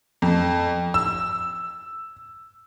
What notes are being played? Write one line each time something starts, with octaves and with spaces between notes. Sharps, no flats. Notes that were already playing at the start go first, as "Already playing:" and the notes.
F2
E6